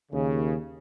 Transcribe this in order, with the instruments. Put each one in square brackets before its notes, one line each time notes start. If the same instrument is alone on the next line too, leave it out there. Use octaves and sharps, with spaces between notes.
[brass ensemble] D#2 C#3